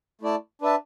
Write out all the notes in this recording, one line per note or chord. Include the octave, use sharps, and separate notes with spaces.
A3 E4 D5 A5
D4 B4 E5 A5